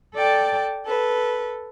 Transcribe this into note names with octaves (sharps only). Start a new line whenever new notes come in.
A4 D5 G5 A5
A4 B4